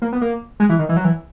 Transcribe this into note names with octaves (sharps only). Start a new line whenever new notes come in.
A#3
B3
A#3
G#3
E3
D#3
E3
F#3
E3